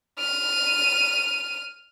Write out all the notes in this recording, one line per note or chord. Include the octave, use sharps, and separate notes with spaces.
F6 D#7